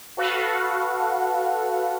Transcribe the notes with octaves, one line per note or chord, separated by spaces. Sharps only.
F#4 A4 B4 F5 F#5